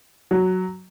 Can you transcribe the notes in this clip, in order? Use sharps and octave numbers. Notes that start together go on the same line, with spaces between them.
F#3